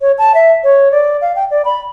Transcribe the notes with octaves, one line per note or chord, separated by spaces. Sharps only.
C#5
A5
E5
C#5
D5
F5
G5
D5
B5